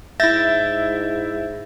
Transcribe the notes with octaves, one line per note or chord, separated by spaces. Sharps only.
G#2 E4 E5 G6 A6 A#6